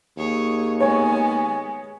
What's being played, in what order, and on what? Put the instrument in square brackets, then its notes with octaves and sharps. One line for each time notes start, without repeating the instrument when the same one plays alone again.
[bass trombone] D#2 [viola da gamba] G#4 C#5
[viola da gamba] G#3 B3 [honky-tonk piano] C#5 [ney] G#5